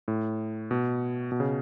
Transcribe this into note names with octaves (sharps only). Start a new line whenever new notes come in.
A2
B2
B2
C#3